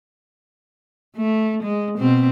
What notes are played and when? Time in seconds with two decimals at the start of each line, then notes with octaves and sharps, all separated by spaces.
1.16 A3
1.63 G#3
1.98 B2 C4